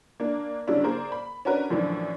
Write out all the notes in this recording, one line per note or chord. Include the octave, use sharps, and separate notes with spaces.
A#3 D4
G2 C#3 F#3 D4 E4
A#3 G#4 A#4 C5 D5
B5
C#4 D4 F#4 A#4 B4
F#2 A2 E3 F3 D4